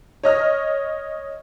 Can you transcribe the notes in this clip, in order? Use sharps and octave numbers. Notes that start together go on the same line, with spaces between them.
C#5 D#5 F6